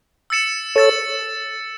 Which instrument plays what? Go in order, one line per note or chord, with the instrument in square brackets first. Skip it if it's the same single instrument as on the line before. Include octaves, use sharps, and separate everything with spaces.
[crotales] E6 A6 C#7 E7
[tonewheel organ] A4 C#5 [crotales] E6 A6 E7